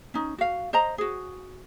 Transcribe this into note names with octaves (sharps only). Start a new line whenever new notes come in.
C#4 D#4
F#4 F5
C5 D#5 A#5
F#4 G#4